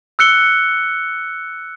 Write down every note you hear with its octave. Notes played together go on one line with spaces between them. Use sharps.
E6 F#6 C#7 G7